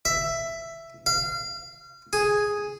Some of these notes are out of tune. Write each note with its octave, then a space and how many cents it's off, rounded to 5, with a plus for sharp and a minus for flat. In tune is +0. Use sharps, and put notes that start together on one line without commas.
E5 +10
F5 -30
G#4 +0